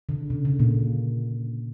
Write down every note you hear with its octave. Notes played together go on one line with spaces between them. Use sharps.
D3
C#3
D3
A#2 A#3